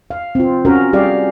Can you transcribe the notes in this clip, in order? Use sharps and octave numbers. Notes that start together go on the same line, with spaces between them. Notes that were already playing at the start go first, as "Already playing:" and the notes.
F5
C4 F4
C#4 F#4 A#4
G3 G4 G#4 D5 F5